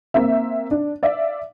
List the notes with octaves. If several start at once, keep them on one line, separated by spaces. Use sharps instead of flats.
A#3 C4 E5
D4
D5 E5 F5